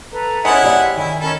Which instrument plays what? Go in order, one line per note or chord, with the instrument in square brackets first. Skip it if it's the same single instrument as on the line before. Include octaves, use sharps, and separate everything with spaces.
[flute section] A4 B4 A#5
[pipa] G#3 C#4 [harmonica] E4 F#5
[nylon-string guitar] C3 G4 D5 [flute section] G#5
[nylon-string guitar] D#3 [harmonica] E4
[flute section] C#4 A#4 B5 [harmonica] A4